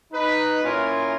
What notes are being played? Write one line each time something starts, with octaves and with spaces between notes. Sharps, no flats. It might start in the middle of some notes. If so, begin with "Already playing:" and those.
D#4 B4
A#2 C#4 E4 F4 A#4 G#5